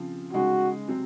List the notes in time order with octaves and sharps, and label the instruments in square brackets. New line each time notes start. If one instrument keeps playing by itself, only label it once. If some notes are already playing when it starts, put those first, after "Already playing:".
Already playing: [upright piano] C#3 F3 C4
[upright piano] C#3 G#3 D#4 [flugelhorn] F#4
[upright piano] C3 F#3 C4